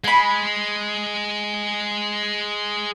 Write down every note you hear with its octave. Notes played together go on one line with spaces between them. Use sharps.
G#3 G#5 B5